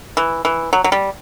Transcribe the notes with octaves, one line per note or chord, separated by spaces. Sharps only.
E3
E3
F#3
F#3
G3